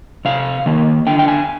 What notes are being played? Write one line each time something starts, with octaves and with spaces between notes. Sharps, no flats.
C3 F5
D#3 A#3
D3 G5
G5
G#5